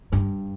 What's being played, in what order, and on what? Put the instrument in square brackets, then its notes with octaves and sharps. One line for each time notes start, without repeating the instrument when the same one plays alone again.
[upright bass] G2